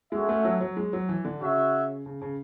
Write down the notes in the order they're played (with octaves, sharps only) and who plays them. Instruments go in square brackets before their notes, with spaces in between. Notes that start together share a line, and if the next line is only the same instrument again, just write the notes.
[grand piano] G#3 [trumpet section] C#4 F#4 A4 E5
[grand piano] A3
F#3
F#3
G#3
F#3
E3
D3
[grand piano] C#3 [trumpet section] F#4 C#5 E5
[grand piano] C#3
C#3